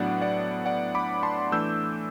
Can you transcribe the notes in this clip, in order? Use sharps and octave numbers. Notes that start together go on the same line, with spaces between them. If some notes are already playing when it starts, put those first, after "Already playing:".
Already playing: A2 F#3 B3 D4 D5 F#5
D5 F#5
D5 F#5
B5 D6
A5 C6
E3 A3 D4 E6 G6